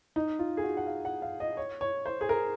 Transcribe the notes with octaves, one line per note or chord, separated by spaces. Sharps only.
D#4
F4
G#4
F#4
F#5
F5
F#5
F5
D#5
C#5
C#5
C5
G#4
A#4